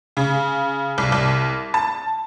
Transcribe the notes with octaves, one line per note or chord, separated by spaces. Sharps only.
C#3
C2
C2
A5